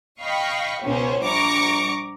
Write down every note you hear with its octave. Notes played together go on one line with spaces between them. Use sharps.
D#5 F5 G5 B5 C#6
C#2 B2 C#4 C5
A#1 G3 A#5 C#6 D6 C#7